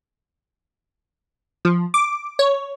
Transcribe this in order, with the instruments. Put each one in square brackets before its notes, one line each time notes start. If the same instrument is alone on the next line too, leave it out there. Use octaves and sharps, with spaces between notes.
[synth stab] F3
D6
C#5